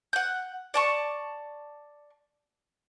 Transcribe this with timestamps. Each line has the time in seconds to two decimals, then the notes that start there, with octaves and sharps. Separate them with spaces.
0.13 F#5 G6
0.74 D5 A5 C#6